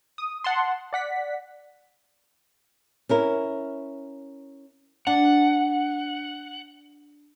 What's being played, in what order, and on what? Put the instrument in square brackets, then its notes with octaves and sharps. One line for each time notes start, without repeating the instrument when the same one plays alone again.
[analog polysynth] D#6
F#5 A5 C6
D5 F#5 B6
[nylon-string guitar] C#4 E4 A#4
[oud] D4 [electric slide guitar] F#5